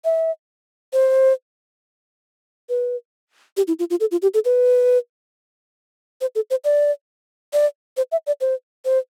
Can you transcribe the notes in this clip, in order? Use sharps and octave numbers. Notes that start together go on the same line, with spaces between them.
E5
C5
B4
G4
E4
F4
F4
A4
F4
G4
A4
B4
C5
A4
C5
D5
D5
C5
E5
D5
C5
C5